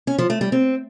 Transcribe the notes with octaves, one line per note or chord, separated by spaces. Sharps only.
C#4
F3
A3
G3
C4